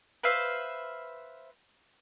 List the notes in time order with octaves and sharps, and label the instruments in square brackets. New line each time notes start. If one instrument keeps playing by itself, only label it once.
[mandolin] B4 C5 E5 F5